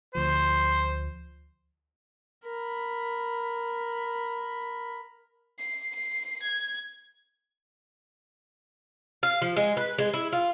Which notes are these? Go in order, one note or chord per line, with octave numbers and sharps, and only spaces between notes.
D2 F3 C5
A#4 B5
C7
C7
G#6
F5
F3
G#3
B4
G#3
E4
F4